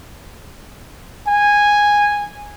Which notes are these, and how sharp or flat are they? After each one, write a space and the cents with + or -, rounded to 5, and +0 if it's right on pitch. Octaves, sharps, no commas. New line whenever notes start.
G#5 -10